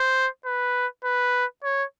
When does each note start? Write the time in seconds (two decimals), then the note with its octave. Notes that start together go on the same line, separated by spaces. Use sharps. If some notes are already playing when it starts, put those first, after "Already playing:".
Already playing: C5
0.46 B4
1.04 B4
1.64 C#5